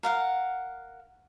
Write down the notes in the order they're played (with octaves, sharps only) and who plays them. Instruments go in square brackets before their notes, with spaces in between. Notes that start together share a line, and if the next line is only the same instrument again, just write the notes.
[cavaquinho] A#4 F5 F#5